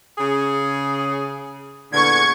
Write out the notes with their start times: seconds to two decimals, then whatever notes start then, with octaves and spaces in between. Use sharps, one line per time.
0.18 C#3 G#4
1.92 E2 A#2 D3 C#6 G#6